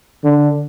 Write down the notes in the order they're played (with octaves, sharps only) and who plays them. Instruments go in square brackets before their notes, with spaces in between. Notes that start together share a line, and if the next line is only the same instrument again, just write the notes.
[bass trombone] D3